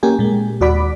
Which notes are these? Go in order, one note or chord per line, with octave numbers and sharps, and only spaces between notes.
A#3 C#4 G4 G#5
A#2 G#3
D#2 F#4 D5 B5 D6